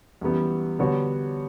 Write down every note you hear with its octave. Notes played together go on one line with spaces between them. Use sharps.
F#2 E3 G3 B3
D3 G3 B3 F#4 C#5